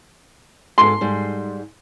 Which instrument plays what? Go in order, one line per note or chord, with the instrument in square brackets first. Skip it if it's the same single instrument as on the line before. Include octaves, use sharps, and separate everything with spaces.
[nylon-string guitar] G#2 A4 [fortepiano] C6
[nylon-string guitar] G#2 G3